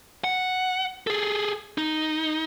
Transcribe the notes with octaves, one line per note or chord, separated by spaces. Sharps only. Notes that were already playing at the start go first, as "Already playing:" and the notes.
F#5
G#4 A4
D#4